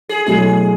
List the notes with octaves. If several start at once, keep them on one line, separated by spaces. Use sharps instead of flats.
G#4
B2 F#3 A3 E4 G#4